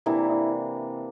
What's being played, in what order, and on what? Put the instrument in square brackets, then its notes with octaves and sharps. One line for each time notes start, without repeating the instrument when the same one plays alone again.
[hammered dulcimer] C3 E3 A#3 D4 [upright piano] E4
[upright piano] E4